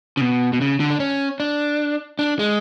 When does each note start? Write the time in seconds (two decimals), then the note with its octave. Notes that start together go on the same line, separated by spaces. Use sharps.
0.17 C#3
0.21 B2
0.53 B2
0.61 C#3
0.80 D3
0.90 D4
1.00 C#4
1.40 D4
2.19 D4
2.39 G#3